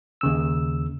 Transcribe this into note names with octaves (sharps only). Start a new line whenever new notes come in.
D#2 C#3 E6